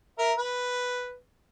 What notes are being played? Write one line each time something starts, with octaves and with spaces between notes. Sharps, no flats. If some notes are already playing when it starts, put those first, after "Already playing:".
A#4 E5
B4